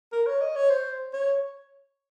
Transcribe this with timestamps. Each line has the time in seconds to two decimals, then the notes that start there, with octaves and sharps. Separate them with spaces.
0.12 A#4
0.27 C#5
0.41 D#5
0.56 C#5
0.70 C5
1.13 C#5